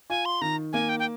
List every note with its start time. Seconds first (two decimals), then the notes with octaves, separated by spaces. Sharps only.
0.10 F4 G#5
0.25 C6
0.42 D#3 A#5
0.73 A#3 G#5
0.89 G5
0.99 G5